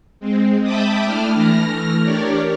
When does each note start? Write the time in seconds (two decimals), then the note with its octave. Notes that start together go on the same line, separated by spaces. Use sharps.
0.20 G#3 C4
0.63 E5 G5 A5 B5 D6 D#6
1.04 A3 D4 E4 F6
1.34 E3 A3 F6 A#6
2.02 D4 G4 A#4 C#5 D5